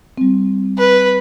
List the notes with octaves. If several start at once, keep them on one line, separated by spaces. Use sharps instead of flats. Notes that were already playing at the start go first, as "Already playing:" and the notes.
G3 C4
B4